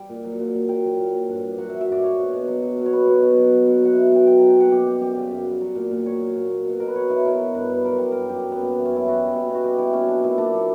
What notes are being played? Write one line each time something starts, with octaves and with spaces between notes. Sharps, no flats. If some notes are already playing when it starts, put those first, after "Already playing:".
Already playing: G3 G5
A#2
F#3
A#2
A#2
F#3 G5
F#3
A#2
F#3
G2
G2
F#3 F#5
F#3 E5
E5
G2 D5
F#3 C#5
B2
B2
F#3
F#3
B2
C#5
F#3 B4
B2
B2
F#3
F#3
B2
F#3 F#5
B2 E5
B2 G5
F#3 G5
F#3 A#5
G5
B2 F#5
F#2 G4
G3 G4
F#2 G4
C#3
F#2
G3
F#3
A#2
A#2
F#3 C#5
F#3
A#2
F#3
B2
B2 A#4
B4
F#3 C#5
F#3 E4
B2 A#4
F#3
G2 B4
G2 B4
F#3 A#4
F#3 G4
G2 A#4
F#2 G4
G3
B3
F#2
E3
F#2 C#4
E4
G3 F#4
G3
B2
B2
F#4
G3 G4
G3 E4
B2 C#4
F#3 D4
A#2 E4
A#2 D4
F#3